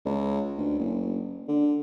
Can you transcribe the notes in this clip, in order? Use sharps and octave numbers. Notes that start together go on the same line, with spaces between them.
C#2
D2
F#1
D3